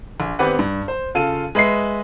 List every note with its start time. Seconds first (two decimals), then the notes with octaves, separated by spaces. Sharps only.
0.20 A#1
0.39 G#1 B3 C4 G4 B4 F#5
0.59 G2
0.88 C5
1.15 C#3 F4 A4 F5 D#7
1.55 G#3 B4 D#5 E5 C7